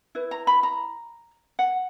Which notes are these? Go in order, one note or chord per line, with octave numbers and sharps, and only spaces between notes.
E4 B4
A#5
B5
A#5
F#5